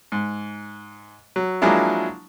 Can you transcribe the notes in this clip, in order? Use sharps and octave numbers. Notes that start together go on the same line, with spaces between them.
G#2
F#3
F3 F#3 G#3 A#3 D4 E4